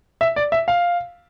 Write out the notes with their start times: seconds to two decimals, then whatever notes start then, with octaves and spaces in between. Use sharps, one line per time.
0.21 E5
0.36 D5
0.52 E5
0.68 F5